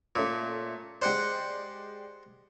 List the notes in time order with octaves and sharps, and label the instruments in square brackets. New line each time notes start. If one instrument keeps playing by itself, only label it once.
[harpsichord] A#2 [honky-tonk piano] A3 C#4 C#5
[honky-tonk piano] G#3 G4 D5 [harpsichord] C5 F#5 G5